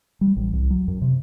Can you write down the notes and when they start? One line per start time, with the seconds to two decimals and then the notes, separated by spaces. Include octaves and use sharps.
0.21 G3
0.37 A1
0.53 C2
0.70 F#3
0.88 F#2
1.02 C3